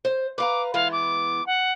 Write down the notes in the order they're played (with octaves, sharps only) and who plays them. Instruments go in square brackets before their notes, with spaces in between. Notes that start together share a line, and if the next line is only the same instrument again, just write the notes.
[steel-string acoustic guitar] C5
[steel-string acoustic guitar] B4 F5 A#5 [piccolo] D6
[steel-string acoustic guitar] E3 G#3 B3 [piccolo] F5
[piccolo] D6
F#5